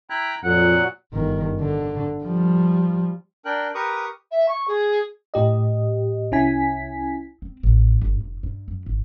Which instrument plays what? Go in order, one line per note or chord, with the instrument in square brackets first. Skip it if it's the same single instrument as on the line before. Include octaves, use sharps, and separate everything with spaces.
[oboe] E4 [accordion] G5 A#5 F#6
[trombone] F2 [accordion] A#2 F#3 [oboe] F#5
[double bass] G1 D#3
D3
F3 G3
[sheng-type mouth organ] D4 A#4 G5 F#6
G4 A#4 B4 A#5 C#6 D#6
[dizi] E5
C#6
G#4
[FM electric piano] A2 G4 D#5
C2 C#4 E4 G#5 B6
[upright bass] C4
A1
G1
F1
G2
F#2
G#1